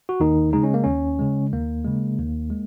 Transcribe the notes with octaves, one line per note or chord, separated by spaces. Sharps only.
F#4
D#2 D#3 D#4
C#3 G#3 D#4
C#4
A#3
D#2 C#4
C#3 G#3
D#2 A#3
C#3 G#3
D#2
G#3